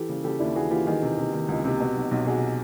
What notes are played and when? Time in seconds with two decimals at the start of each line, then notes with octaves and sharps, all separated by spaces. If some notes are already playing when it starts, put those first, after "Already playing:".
Already playing: E3 G4 A4
0.09 C#3
0.24 C#3 G4 A4
0.39 D#2 D4 E4
0.55 E3 F#4 G#4
0.71 E3 F4 G4
0.86 D#3 F#4 G#4
1.02 C3
1.18 C3
1.33 D#3
1.48 C#2
1.65 C3
1.80 B2
1.96 B1
2.11 B1
2.26 B2 F#4 G#4